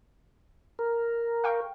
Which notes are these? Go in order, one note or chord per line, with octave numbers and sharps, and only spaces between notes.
A#4
F5 G5 C#6